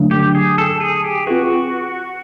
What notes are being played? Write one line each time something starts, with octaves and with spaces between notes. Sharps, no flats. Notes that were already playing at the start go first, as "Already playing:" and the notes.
Already playing: D3 F#3 A3 D4
G4
G#4
A4
G#4
G4
C4 F4 F#4 G#4 B4